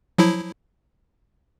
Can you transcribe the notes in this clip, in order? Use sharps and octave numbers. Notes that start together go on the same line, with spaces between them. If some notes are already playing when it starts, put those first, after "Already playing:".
F3 F#3 E4